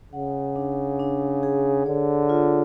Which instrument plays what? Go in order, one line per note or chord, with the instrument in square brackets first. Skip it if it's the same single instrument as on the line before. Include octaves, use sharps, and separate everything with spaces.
[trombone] C#3 [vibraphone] F#5
[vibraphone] D4
D4
G#4
[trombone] D3 [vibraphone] C#5
[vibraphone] F4